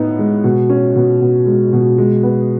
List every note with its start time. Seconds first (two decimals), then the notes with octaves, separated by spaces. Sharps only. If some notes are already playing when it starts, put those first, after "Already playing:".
Already playing: A2 B3 D#4
0.19 G#3
0.44 B2
0.70 C#4
0.96 B2
1.21 B2
1.46 G#3
1.73 B2
1.98 G#3
2.23 B3